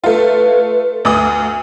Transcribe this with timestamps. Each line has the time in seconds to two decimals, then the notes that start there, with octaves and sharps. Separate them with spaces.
0.04 A3 F4 B4
1.05 D2 D#6